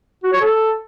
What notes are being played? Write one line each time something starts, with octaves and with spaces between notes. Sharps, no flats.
F#4
C#5
A4